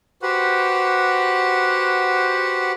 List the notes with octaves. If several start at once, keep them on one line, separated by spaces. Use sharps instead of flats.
F#4 G4 B4 C5 F#5